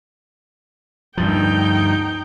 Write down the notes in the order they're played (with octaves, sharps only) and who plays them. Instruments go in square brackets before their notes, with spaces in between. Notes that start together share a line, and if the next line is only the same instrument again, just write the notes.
[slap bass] D2 G2 F3 [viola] D#4 G5